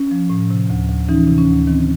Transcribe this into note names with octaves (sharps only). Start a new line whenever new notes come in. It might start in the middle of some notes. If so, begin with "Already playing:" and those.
Already playing: C#4
F3
A2
C3
D2
D2
E3 C#4 D#4
C3
C#4
D2
D#3 C4